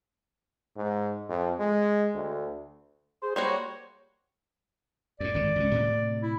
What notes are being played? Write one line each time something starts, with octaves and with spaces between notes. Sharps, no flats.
G#2
F2
G#3
D2
G#4 C5
G3 A#3 F#4 C5 C#5
F#2 A2 D5
G#1 F#2 D3
C#2 C#4
A2 C3
E4